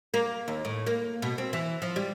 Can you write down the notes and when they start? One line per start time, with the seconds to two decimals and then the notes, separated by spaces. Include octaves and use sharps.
0.14 A#3
0.48 D#2
0.65 A2
0.87 A#3
1.22 B2
1.38 C4
1.53 E3
1.82 F3
1.96 G3